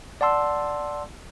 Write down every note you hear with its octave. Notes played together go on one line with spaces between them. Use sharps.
D5 F#5 A5 C6 E6